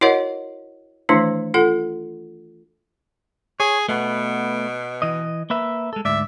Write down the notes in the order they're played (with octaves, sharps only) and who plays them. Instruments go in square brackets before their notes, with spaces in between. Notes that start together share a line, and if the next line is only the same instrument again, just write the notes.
[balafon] E4 F#4 A#4 C#5 D#5 F#5
D#3 E3 A3 D4 E4
F4 A4 F#5
[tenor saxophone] G#4 [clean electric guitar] C#5
[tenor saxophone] B2 [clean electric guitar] A3 B3
[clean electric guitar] E3 D#5
A#3 B4 E5
G#3 A4
[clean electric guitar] D2 G#2 D5 [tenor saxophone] E5